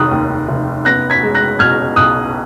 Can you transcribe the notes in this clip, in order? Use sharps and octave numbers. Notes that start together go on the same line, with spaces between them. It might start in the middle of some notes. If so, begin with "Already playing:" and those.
Already playing: F1 D#3 D#6 F#6
D#2
F1
B3 F#6 A#6
G#6 B6
G#3
F#6 A#6
B2 F6 G#6
B1 D#6 F#6